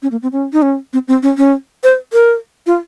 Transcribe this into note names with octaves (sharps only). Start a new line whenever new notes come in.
C#4
A#3
C4
C#4
D#4
C#4
C4
C4
C#4
C#4
C5
A#4
F4